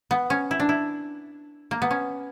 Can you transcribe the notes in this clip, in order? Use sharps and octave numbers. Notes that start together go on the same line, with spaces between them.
B3
C#4
E4
D4
E4
A#3
B3
C#4